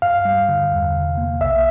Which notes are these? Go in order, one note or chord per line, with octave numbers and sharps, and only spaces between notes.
G2 F5
G3
D3
E2
C3
A#3
B1 E5